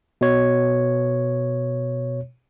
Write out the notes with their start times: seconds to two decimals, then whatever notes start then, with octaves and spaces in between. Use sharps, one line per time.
0.21 B2 C#5